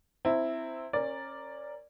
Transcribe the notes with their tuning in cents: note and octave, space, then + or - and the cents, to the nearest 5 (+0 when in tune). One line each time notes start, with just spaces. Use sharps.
C4 +0 E4 +0 A#5 -25
C#4 -25 A#4 +0 D5 +0